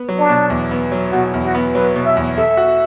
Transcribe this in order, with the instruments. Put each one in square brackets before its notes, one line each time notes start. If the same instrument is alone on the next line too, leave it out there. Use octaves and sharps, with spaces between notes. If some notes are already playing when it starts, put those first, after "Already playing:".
Already playing: [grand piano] B3
F#3
[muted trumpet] D4
[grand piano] B2
E2
B3
F#3
[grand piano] B2 [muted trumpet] F#4
[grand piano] E2
[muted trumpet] F#4
[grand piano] B3
[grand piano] F#3 [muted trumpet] B4
[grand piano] B2
[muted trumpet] E5
[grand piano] E2
[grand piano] A4 [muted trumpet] E5
[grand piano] F#4